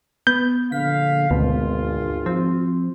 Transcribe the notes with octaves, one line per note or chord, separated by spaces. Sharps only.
B3 G6
A#1 D3 F5 B6
G#1 D2 B2 F4
F3 C4